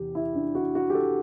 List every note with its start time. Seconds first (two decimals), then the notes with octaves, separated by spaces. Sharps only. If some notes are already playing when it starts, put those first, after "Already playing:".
Already playing: E2 C3 E3 G4
0.15 E4
0.35 D4
0.55 F#4
0.75 F#4
0.90 G4
0.94 A4